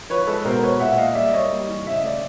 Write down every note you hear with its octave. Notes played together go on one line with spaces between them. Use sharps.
F3 B4 C#5
G#3 A4 B4
B2 A#4 C5
G#3 B4 C#5
A#2 E5 F#5
A#3 D#5 F5
G3 D5 E5
A#3 C#5 D#5
G3
E3
C#3 E5
D#5
A3 D5